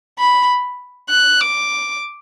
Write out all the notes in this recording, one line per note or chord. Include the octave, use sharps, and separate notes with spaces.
B5
F#6
D6